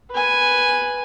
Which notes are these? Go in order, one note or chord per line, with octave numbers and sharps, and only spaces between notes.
B4 G#5